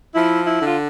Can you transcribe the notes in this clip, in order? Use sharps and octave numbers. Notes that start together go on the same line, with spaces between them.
F3 E4
E4
D3
F4